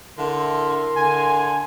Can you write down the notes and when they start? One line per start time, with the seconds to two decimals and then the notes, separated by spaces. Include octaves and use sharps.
0.18 D3 E4 A#4 C6
0.96 D3 G#5